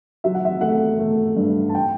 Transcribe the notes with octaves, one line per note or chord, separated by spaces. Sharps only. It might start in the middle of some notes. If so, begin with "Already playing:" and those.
F#3 E5
F#5
E5
A3 F#5
A3
G2
A5
G5